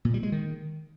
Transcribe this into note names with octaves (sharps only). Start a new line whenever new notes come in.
A#2
G3
G#3
D#3